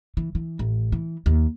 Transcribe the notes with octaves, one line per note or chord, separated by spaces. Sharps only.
E3
E3
A1
E3
D#2